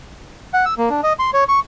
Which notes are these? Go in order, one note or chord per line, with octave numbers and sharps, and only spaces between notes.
F#5
E6
A#3
D4
D#5
C6
C#5
C#6